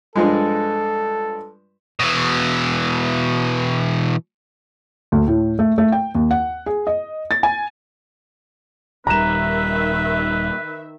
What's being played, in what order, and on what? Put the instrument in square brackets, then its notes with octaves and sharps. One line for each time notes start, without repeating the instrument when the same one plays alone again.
[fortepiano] G2 F3 G#3 [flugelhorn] A4
[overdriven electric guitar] B2 E3
[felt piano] D2
A2
A3
A3
G5
D#2
F#5
G#4
D#5
A6
G#5
[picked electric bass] D#1 G3 [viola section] D#3 E5 [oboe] B4 [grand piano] A#5 E7